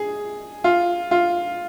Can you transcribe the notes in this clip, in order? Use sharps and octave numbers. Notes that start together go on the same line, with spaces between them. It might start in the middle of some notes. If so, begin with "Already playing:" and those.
Already playing: G#4
F4
F4